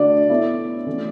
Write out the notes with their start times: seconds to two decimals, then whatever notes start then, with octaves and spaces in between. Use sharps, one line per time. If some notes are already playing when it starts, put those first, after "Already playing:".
Already playing: D3 A3 D4 F#4 D5
0.29 B3 E4 A4 C#5 E5
0.87 E3 A3 C#4 F#4